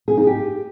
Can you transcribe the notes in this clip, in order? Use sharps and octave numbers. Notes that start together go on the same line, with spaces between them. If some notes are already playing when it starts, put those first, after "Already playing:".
G#4
D#4
G4